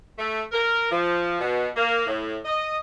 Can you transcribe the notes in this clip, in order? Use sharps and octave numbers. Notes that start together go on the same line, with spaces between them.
A3
A#4
F3
B2
A#3
A2
D#5